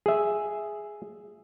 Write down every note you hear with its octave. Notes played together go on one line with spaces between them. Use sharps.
G#4 E5